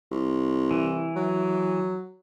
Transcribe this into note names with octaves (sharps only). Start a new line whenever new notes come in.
C2
E3
F#3